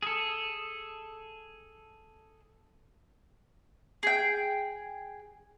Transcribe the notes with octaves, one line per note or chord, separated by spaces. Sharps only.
G#4 A4
G#4 G5